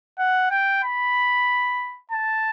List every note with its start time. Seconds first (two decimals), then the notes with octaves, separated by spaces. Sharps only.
0.19 F#5
0.51 G5
0.83 B5
2.11 A5